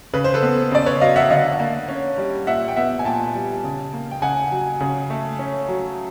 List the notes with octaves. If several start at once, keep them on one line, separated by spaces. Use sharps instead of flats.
C#3 B4
C5
A4 B4
B3
C#3 D5
B4 C#5
F#3 D#5 F5
E5 F#5
D3 D#5 F5
A#3
C#4
G3
A#2 E5 F#5
G5
B3 E5 F#5
G#5
A#2 G5 A5
G3
C#3
A#3
G5
C#3 F#5 G#5
F#3
C#3
A3
C#4
F#3